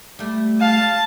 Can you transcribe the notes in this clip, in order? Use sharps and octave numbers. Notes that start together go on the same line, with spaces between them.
G3 A3
F5 A5